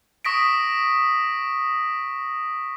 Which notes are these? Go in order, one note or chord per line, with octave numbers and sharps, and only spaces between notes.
C#6 D#6 A#6 B6 D7